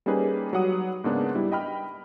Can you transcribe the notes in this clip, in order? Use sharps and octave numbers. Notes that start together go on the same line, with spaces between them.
G3 A#3 C#4 D#4 G#4 B4
F#3 G3 F#5 D#6 D#7
G#2 C#3 A#3 B3 D4
G3 E4
D#5 G5 B5 F6